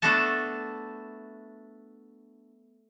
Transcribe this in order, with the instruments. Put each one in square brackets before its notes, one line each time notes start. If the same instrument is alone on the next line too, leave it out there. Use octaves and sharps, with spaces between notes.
[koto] A3 B3 D4 F#4 A4 A5